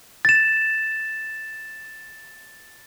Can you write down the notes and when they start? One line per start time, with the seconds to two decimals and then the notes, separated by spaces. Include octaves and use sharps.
0.25 A6 E7